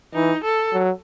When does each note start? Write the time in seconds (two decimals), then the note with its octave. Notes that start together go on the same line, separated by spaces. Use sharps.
0.14 E3 D#4
0.44 A4
0.73 F#3